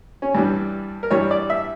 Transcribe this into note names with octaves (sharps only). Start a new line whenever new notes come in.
C#4
G2 E3 G3 D4
A#4
G2 E3 G3 C#5
D5
E5